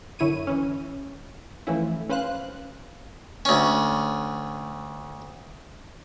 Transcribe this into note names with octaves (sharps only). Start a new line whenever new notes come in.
F#2 D3 E4 C#5 D#7
E3 C#4
E3 F3 A3 C#4 E4
C#4 B4 C5 F5 F#6
D2 C#4